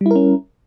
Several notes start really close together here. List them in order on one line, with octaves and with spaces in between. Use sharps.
G3 E4 A#4 C#4